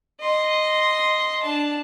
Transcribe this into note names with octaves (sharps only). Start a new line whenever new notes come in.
D#5 C6
D4 A5